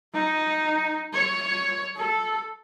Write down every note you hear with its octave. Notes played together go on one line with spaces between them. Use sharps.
D#4
C#5
A4